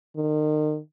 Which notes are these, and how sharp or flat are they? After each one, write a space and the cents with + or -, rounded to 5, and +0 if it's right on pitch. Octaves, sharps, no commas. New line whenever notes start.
D#3 -35